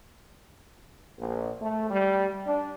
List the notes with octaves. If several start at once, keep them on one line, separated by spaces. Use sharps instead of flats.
A#1
A3
G3
D4